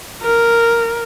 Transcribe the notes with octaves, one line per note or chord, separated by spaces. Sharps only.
A#4